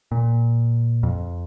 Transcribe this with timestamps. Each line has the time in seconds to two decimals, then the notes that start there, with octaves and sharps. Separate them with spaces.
0.12 A#2
1.03 F2